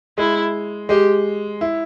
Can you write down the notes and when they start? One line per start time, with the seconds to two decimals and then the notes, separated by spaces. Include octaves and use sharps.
0.18 G#3 E4
0.89 G#3 G4
1.61 E4